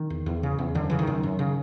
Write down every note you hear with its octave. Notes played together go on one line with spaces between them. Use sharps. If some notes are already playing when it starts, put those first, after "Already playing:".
Already playing: D#3
E2
E2
C#3
E2
F#2 D3
C#3 E3
D#3
F#2
F#2
C#3